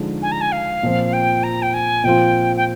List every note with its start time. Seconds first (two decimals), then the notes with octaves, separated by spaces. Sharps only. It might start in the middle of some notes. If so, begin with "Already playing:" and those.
Already playing: D3 F3 G#3 D#4
0.22 G#5
0.32 A#5
0.41 G#5
0.52 F5
0.83 A#2 F3 C4
1.13 G5
1.43 A#5
1.62 G5
1.74 G#5
2.04 A#2 F3 C4 F4 G5
2.56 G5